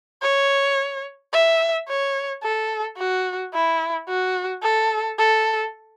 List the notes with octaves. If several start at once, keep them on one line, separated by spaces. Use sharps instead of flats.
C#5
E5
C#5
A4
F#4
E4
F#4
A4
A4